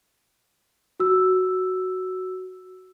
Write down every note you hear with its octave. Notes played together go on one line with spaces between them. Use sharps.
F#4 E6